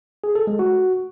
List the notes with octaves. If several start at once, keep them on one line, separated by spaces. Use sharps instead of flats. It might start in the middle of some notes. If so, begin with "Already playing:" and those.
G#4
A4
G#3
F#4